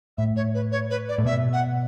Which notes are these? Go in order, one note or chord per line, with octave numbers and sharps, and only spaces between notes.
A2 E5
C#5
B4
C#5
B4
D5
A2
B2 E5
F#5